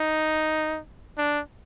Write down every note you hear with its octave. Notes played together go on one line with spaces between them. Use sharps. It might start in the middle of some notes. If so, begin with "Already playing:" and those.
Already playing: D#4
D4